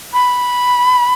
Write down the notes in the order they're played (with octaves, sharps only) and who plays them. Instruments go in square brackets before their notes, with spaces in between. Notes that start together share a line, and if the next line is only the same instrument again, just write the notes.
[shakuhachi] B5